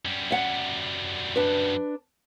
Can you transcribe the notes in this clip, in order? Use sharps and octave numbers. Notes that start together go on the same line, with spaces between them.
F#2 G3
E5 F#5
D4 B4